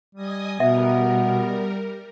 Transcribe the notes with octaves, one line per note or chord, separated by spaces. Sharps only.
G3 D#5 G#5 D#6
B2 G3 B3 A#4 E5